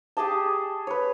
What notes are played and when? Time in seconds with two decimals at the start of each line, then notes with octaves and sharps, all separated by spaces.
0.17 G4 G#4 D#5 A5
0.87 B4 C#5